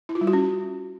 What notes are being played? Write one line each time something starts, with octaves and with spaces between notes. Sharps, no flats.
E4
F4
G3
F#4
C#4